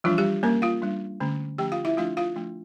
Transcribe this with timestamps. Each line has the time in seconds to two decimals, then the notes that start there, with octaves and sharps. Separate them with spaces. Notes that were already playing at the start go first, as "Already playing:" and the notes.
0.04 E3 F3 G3 D4 F4
0.18 G3 G4
0.43 G3 A#3 C#4 A#4
0.62 F4 F5
0.82 G3 D4
1.20 D3 A3 C#4
1.58 F3 A3 C#4 G4 G5
1.72 F4 F5
1.85 E4 E5
1.97 F3 A3 D4 F4 F5
2.17 F4 F5
2.36 F3 A3 D4